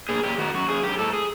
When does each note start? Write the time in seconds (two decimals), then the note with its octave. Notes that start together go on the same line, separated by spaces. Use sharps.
0.09 A#2 G#4
0.23 A#2 G4
0.38 D#3 F#4
0.54 F#2 F#4
0.68 F#2 G#4
0.83 F#2 G4
0.99 G#2 A4
1.13 G#4